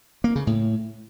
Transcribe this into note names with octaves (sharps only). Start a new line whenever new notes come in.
A#3
C#3
A2